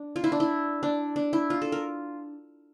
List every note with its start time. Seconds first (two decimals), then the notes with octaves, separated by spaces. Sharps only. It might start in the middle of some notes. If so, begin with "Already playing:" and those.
Already playing: D4
0.16 F4
0.24 E4
0.32 D4
0.40 E4
0.83 D4
1.16 D4
1.33 E4
1.50 F4
1.62 A4
1.72 A#4